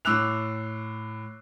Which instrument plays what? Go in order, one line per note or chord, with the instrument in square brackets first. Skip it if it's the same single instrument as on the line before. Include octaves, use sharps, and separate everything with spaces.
[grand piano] A2 D6 E6 F#6 F7